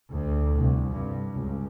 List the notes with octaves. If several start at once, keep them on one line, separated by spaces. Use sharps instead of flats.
D2
C2
G2
C#2